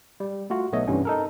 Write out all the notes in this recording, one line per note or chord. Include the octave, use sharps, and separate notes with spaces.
G3
A3 F4 F#4
B1 A3 B3 C#5 D#5
G2 C3 E3 C#4
D#4 A4 A#4